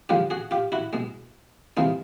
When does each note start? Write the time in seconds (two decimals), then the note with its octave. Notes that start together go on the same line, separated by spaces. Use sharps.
0.09 D3 F3 G#3 F4 G4
0.30 F#4 G#4
0.51 F4 G4
0.72 E4 F#4
0.93 B2 G#3
1.77 C3 E3 G#3 D#4 F4